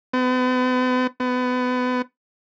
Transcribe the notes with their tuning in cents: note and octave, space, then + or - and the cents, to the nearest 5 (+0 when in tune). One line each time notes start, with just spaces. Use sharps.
B3 +40
B3 +25